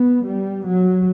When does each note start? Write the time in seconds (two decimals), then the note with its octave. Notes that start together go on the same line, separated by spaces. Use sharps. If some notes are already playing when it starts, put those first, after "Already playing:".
Already playing: B3
0.27 G3
0.66 F#3